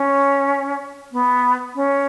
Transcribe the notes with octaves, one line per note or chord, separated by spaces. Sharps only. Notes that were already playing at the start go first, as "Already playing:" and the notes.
Already playing: C#4
B3
C#4